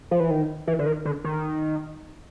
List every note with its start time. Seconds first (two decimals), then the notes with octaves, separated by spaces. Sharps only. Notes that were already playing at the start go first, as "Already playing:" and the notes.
0.11 F3
0.20 E3
0.31 D#3
0.67 E3
0.79 D3
0.86 D#3
1.05 D3
1.24 D#3